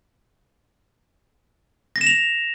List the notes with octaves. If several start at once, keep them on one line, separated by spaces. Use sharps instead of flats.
A#6
E7
F7